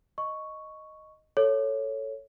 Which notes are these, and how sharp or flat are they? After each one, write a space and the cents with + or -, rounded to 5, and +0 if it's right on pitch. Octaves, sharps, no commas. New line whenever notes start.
D#5 +0 C#6 +0
A4 +0 C#5 +0